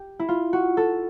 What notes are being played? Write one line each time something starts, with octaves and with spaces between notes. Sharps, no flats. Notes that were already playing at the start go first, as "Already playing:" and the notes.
Already playing: G4
E4
F4
F#4
A4